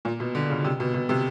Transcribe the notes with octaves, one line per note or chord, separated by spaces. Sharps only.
A#2
B2
D3
C#3
C3
B2
B2
C3